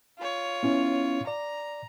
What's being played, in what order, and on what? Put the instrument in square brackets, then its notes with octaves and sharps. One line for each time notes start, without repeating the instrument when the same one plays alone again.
[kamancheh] F4 C#5
[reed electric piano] B3 C#4 E4
[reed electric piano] D5 [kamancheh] A#5